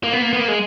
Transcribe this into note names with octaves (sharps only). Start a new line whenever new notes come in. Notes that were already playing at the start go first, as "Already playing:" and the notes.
A#3
B3
A#3
B3
A#3
G#3